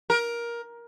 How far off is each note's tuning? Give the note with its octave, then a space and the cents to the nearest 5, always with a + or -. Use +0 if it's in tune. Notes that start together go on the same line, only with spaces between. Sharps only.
A#4 +15